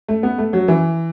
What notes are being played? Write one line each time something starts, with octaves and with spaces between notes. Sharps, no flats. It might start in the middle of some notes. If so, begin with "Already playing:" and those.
A3
B3
A3
F#3
E3